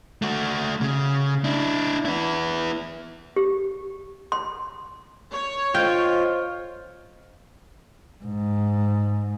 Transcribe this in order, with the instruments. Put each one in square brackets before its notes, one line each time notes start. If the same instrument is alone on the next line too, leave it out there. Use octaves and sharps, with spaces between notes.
[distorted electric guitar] A3 F#4
C#3
D4 E4
B3 E4
[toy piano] G4
C6
[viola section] C#5
[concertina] F4 [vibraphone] C5 D#5 [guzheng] G5
[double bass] G#2